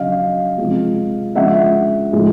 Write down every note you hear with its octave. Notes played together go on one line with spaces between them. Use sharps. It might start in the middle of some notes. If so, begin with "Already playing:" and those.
Already playing: C#3 F#3 D#5 F5
C3 F3 G#3
C#3 F3 G#3 E5 F#5
A2 F3 G#3